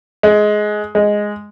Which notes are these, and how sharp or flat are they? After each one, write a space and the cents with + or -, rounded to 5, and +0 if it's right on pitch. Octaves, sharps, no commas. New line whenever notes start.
G#3 +20
G#3 +0